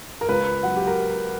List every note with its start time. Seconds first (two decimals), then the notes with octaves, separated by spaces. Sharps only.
0.21 A#4
0.29 C#2 B4
0.63 F#3 F#5
0.76 G4
0.87 A#4